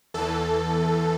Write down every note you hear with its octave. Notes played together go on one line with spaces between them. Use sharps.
E2 E3 A4